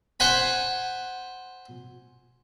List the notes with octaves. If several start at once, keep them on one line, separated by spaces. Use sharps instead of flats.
C5 F#5 G#5 B5